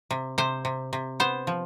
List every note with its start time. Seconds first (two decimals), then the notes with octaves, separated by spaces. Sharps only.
0.11 C3
0.38 C3 C5
0.65 C3
0.93 C3
1.20 B3 C5
1.47 F3